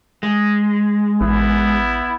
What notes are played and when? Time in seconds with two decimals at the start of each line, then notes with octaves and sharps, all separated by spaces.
0.23 G#3
1.21 A1 B3 E4